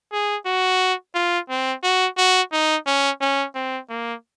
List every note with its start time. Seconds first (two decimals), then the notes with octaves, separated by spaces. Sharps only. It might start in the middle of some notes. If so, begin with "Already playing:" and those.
0.12 G#4
0.46 F#4
1.15 F4
1.49 C4
1.83 F#4
2.18 F#4
2.52 D#4
2.87 C#4
3.21 C#4
3.55 C4
3.90 A#3